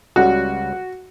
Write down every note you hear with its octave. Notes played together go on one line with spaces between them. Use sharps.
C#2 C#3 G3 F#4